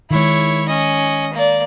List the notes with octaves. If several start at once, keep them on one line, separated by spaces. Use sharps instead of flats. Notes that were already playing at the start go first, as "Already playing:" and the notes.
D#3 G#3 E4 C#5
C#4 D#5
A#3 D5